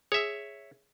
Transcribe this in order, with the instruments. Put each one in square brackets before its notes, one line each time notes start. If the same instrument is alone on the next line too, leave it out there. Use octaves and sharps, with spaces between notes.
[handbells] G#4 E6 [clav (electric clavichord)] C#5 E5